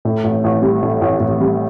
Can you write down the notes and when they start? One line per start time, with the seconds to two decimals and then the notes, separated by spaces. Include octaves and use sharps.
0.05 A2
0.24 A1
0.44 A1
0.62 G3
0.82 A2
1.01 A1
1.20 A1
1.40 G3